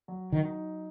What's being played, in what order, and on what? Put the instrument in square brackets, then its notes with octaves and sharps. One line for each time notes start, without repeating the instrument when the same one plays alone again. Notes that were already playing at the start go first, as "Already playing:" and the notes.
[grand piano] F#3
[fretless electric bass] D#3
[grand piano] D#4